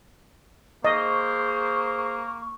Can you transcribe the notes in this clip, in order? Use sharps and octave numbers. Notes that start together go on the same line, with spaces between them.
A#3 G#4 C5 D#5 C#6